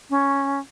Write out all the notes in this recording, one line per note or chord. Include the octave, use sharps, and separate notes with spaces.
C#4